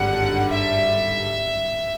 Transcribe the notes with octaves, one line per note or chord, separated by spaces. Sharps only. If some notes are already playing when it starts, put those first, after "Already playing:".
Already playing: G#1 G2 D3 G3 F#5
E5